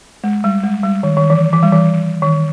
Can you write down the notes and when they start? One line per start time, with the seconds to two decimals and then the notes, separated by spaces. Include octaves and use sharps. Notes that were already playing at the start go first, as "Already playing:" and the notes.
0.24 G#3
0.44 G3
0.63 G#3
0.84 G3
1.03 D#3
1.17 D#3
1.30 E3
1.53 E3
1.63 G3
1.72 E3
2.22 D#3